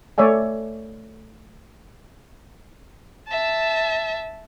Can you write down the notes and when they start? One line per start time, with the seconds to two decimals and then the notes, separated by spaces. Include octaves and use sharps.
0.18 A3 C#5 D5 E5 G#5
3.28 E5 A5